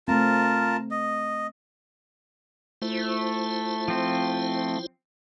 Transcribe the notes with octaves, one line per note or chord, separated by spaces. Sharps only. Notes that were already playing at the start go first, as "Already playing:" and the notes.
A3 C4 F4 A#4 A5
D#5
A3 E4 F4 C5
F3 C4